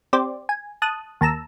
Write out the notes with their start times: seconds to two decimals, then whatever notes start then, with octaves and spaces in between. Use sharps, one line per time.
0.13 C4 G4 C5 D5
0.49 G#5
0.82 A5 D#6 F#6
1.21 D#2 A5 A#5 E6